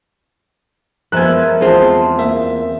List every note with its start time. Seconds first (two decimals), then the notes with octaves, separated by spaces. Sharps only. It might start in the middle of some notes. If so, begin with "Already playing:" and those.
1.12 F3 G#3 B3 A#4 E5 G#5 F#6
1.61 E2 G#3 C4 F4 F#4 C5 A5
2.19 A#3 E5